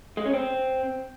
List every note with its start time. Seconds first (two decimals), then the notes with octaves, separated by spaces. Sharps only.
0.17 G#3
0.25 C#4
0.34 C4